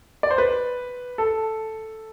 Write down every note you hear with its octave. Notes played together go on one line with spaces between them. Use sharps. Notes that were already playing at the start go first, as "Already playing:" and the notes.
D5
C5
B4
A4